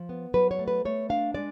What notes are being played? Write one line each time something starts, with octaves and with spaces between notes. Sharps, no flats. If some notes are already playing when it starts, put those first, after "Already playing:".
Already playing: F3
B3
F#3 B4
C#5
A3
B4
A3 C#5
D4 F5
G#3 D5